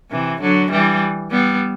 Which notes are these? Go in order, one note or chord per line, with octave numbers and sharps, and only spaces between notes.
C3 E3
D3 F#3
E3 G3
G3 B3